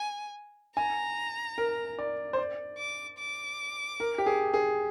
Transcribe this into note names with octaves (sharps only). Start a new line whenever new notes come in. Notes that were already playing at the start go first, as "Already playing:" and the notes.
Already playing: G#5
G#5 A#5
A#4
D5
C5
D5
D6
D6
A#4
G4
G#4
G#4